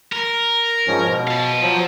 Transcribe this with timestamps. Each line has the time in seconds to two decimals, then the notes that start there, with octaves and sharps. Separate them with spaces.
0.12 A#4
0.87 G#2 F3 C#4
1.06 B2
1.27 F5 A5
1.62 F3 F#3